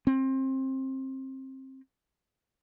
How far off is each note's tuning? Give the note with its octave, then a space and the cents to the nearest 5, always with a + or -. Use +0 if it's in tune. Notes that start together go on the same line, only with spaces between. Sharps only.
C4 +25